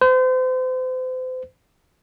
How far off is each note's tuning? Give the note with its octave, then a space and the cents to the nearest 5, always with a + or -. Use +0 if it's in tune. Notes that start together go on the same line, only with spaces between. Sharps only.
C5 -40